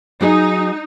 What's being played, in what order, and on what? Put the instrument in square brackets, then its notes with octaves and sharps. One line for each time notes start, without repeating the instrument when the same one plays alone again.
[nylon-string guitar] F#3 G#4 [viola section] D#4